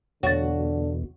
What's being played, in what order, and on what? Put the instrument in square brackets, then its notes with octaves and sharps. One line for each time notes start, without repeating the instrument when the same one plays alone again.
[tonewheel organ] E2 B2 [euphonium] D3 [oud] F#4 [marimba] C#5 A6